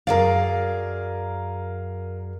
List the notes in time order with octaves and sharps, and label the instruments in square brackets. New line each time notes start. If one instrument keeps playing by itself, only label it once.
[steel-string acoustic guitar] F#2 G#4 D5 [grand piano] A#4 F5